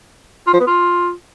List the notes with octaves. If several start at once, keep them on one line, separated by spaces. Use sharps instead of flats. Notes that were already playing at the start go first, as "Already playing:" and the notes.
F4
F3
B3
F4